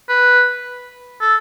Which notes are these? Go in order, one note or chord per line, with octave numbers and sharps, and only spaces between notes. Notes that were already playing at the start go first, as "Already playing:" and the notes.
B4
A4